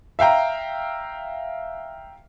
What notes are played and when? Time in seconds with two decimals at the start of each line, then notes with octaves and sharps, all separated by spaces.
0.19 E5 F5 G5 A#5